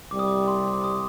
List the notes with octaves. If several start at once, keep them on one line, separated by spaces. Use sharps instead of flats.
C2 C3 G3 D6
D#6
D6
C6
D6
D#6